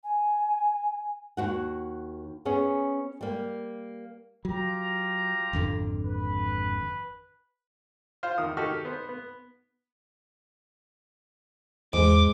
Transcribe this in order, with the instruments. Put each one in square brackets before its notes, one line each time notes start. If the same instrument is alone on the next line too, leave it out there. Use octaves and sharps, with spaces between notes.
[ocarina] G#5
[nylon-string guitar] D#2 F#4 F#5
B3 C#4 G#4
G3 A#3
[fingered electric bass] F#3 [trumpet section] F4 G4 A#5
[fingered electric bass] G#1 F2 D3
[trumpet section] B4
[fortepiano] F4 C5 F6
E2 D#3 D#6
D#3 D#4 F#4 G4 A4 F6
B3 C5
B3
[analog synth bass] E2 [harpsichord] G#2 [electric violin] D6